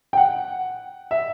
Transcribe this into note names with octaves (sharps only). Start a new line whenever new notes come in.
G5
F#5
E5